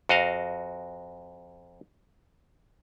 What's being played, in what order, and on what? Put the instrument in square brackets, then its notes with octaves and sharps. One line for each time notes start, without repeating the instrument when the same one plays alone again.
[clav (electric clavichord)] F2 F#4 D#5 F5